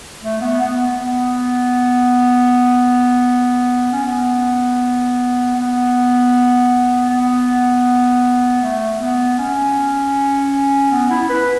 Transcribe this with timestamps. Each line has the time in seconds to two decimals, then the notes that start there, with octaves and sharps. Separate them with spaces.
0.23 A3
0.41 B3
0.61 B3
0.99 B3
3.92 C#4
4.04 B3
5.57 B3
7.09 B3
8.63 A3
9.00 B3
9.38 C#4
10.91 B3
11.10 E4
11.30 B4